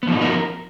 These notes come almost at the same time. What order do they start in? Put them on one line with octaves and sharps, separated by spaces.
B3 F3 D#4 F#4 A#4